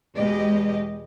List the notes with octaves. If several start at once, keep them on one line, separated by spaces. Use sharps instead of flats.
E2 B2 G#3 G4 D#5